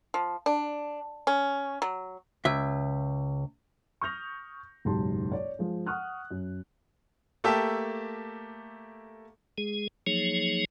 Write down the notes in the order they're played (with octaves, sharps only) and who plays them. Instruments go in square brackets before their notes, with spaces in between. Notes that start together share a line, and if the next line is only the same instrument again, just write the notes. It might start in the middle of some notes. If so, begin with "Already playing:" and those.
[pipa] F3
D4
C#4
F#3
[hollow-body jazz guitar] C#2 E5
[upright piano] C#6 D#6 F6 G6 A#6 F7
F#1 B1 G#2 G4 A5 C6
C#5 D5
F3 G#3
F#5 C#6 D#6 F6 F#6
F#2
[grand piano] A3 A#3 G4 E5 A5
[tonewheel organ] G#3 G#4
F3 F#3 A#3 D#4 G#4 C#5